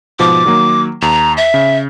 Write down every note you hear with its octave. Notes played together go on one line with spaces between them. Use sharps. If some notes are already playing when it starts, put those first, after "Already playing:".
G#2 B2 F3 D6
D#3 F#3 A#3
D#2 A#5
E5
C#3